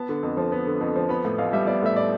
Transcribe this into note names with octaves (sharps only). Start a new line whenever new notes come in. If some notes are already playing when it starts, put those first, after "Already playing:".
Already playing: B3 A5
D3
F2
F3
B3
D3
F2
F3
B3 B5
A2
A1 F5
G3 E5
B3 D5
A2 E5
D5